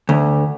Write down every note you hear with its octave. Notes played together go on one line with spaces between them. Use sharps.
D2